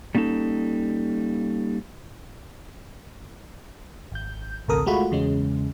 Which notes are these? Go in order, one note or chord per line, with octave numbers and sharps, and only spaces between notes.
G3 A#3 C#4 D#4 A4
G#1 G6
A1 D2 C3 A4 A#4 D#6
G#3 A3 F4 F#4 B5
E2 C#3 G#3 C#4